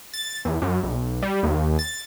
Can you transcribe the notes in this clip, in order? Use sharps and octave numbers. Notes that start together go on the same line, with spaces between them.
A6
E2
F#2
B1
G3
D#2
A6